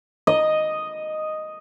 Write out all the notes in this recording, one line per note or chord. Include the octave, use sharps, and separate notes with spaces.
D#5